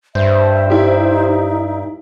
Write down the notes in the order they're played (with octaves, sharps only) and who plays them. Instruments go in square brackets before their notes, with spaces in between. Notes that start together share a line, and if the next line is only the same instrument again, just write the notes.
[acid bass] G2 [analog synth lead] C5 [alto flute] E5
[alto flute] D#4 [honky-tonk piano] E4 G4